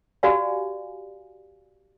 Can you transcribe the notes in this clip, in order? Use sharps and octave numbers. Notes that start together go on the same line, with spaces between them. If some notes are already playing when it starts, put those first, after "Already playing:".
F#4 G4 B4 D5 F5 G#5